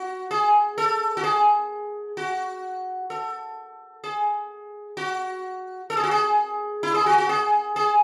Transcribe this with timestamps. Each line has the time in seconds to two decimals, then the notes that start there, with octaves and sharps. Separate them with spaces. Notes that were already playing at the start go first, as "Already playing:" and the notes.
Already playing: F#4
0.31 G#4
0.78 A4
1.17 F#4
1.24 G#4
2.17 F#4
3.10 A4
4.04 G#4
4.97 F#4
5.90 A4
5.97 G#4
6.03 F#4
6.11 G#4
6.83 E4
6.94 G#4
7.06 F#4
7.18 F#4
7.29 G#4
7.76 G#4